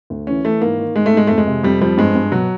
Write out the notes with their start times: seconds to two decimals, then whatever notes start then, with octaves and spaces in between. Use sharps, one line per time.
0.10 D2
0.27 E3 C#4
0.45 E3 A3
0.61 G#2 A#3
0.78 D#3
0.96 G#2 G#3
1.06 A3
1.12 G#2 G#3
1.27 F2 A3
1.38 G#3
1.47 C3
1.63 F2 G3
1.81 F3 G3
1.97 G2 G#3
2.15 G2
2.32 B2 F#3